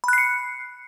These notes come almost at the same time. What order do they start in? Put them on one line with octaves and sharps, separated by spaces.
B5 F#6 C7 C#7